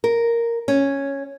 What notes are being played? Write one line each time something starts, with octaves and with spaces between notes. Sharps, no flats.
A#4
C#4